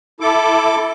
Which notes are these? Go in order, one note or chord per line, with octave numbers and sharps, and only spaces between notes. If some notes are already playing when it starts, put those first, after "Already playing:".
E4 A4 D6